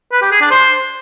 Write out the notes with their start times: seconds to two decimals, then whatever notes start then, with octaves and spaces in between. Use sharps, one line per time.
0.12 B4
0.22 G4
0.31 G#4
0.41 D4
0.51 C5